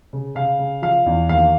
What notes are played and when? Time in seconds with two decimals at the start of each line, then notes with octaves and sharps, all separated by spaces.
0.13 C#3
0.35 C#3 F5
0.59 C#3
0.82 F3 F5
1.06 E2
1.29 D#2 F5